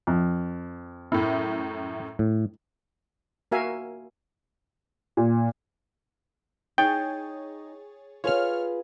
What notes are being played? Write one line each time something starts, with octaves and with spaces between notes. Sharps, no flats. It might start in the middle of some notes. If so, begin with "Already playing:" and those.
F2
F#2 A2 E4
A2
A#3 F#4 A#4 E5 F5 G#5
A#2
D#4 G#4 C#5 G5 A6
F4 G#4 B4 C#5 F6